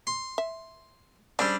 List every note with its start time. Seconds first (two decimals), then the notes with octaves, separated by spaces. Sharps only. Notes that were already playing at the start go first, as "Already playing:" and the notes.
0.07 C6
0.38 E5
1.39 C#3 G3 C4 D4